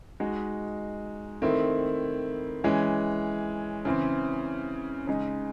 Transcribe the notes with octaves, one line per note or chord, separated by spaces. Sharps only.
G#3 D#4 F#4
D#3 A3 C4 E4
E3 G#3 C#4
C#3 E3 C4
C#3 G#3 D#4